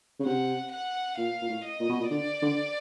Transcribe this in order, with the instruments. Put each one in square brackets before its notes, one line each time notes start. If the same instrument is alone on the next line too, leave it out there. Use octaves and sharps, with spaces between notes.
[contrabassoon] C#3
[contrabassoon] C3 [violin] F#5
[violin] F#5
[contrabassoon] A#2 [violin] F5
[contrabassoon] A#2
A2
[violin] D#5
[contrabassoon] A#2
B2
A#2
[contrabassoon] D3 [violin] D5
[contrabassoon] D3